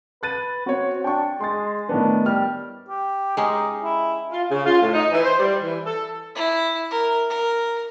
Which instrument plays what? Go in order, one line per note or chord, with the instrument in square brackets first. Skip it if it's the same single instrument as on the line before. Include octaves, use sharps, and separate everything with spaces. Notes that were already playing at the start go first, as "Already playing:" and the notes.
[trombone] B4 [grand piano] F#6 A6 D#7
[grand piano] C4 C#5 [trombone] F#4
[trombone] D4 [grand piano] G5 C#6
[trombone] G#3 [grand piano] C6 A6
[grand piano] A2 D#3 B3 [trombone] D4
[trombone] G3 [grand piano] F6
[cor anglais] G4
[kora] G#3 C#4 G4 [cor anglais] D#4
[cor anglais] E4
[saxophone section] F4
C#3
F4
A2
D#4
E3
C5
G3
E3
A4
[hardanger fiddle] E4
A#4
A#4